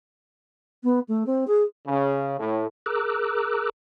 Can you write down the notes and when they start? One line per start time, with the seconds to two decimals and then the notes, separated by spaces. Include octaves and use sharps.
0.83 B3
1.08 A3
1.26 C4
1.47 G#4
1.87 C#3
2.39 A2
2.86 G#4 A#4 A#5 D6 E6 F#6